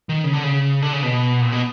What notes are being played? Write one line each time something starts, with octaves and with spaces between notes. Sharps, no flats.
D#3
C#3
D3
C#3
D3
C#3
B2
A#2
B2